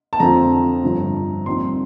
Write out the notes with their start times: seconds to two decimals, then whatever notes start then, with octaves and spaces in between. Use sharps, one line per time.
0.13 A5
0.20 F2 D3 F3 C4 F4 A#5
0.83 G1 G2 F3
1.46 A#1 A#2 G3 C4 D#4 C6